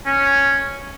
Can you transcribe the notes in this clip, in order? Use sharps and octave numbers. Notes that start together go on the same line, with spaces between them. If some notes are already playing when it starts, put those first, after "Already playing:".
C#4